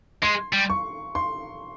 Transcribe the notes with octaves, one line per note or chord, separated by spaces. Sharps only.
G#3 C6
G3
C#6
C6